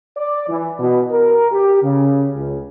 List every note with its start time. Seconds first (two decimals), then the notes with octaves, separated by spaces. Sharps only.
0.17 D5
0.49 E3
0.80 B2
1.11 A#4
1.52 G4
1.83 C#3
2.35 C#2